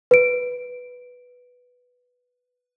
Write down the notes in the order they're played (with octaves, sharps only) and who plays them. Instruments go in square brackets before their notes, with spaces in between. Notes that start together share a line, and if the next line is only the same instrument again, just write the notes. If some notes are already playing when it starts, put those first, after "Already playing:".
[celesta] B4 D7